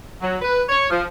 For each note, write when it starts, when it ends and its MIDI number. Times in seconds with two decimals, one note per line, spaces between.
0.20 0.37 54
0.42 0.62 71
0.69 0.88 73
0.90 1.04 53